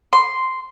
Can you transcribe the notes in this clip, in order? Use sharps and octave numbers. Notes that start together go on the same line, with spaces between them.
C6